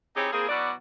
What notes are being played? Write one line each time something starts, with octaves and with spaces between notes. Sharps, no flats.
C4 D#4 E4 G4 G#4 C#5
A#3 C4 E4 G#4
B2 F#3 E4 F#4 D5